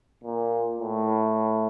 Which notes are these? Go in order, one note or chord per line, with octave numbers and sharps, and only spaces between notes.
A#2
A2